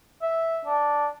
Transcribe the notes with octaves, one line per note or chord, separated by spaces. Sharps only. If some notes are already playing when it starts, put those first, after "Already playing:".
E5
D4